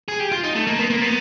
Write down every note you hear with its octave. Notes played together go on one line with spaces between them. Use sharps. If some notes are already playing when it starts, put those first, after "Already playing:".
G#4
G4
F4
D#4
A3
A#3
B3
A#3
B3